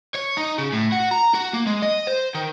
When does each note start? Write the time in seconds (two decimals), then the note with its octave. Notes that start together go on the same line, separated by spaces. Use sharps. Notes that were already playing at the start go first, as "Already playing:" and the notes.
0.15 C#5
0.37 D#4
0.58 C#3
0.73 A2
0.92 F#4
1.11 A#5
1.34 F#4
1.53 A#3
1.66 G#3
1.82 D#5
2.07 C5
2.35 D#3